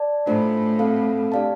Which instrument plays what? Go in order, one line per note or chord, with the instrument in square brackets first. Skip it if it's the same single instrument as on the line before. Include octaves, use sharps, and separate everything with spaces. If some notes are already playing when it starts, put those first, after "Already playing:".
Already playing: [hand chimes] D5 A5
[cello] A2 [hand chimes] A3 D4 F4 C5
[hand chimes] C4 A4 F5
D4 G4 D5 F5 A5